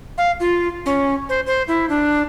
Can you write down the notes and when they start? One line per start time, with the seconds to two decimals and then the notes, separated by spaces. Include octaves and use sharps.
0.18 F5
0.40 F4
0.86 C#4
1.29 C5
1.46 C5
1.68 E4
1.89 D4